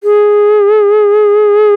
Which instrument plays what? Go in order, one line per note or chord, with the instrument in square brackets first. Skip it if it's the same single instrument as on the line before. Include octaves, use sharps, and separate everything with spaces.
[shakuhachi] G#4